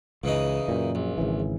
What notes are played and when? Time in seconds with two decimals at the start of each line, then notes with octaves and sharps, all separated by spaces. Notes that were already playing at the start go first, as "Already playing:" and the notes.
0.24 C#2 C#3 E3 D#4
0.68 F#2 A#2
0.95 A#1
1.18 G#1 C#3 E3